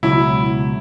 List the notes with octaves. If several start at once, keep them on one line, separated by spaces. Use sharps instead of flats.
C#2 B2 F#3 E4